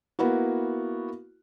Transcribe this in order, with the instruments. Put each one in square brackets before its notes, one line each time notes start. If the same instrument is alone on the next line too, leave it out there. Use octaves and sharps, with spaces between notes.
[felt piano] A#3 B3 E4 F#4